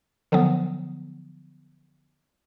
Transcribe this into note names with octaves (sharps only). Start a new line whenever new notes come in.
D3 F3 F#3 B3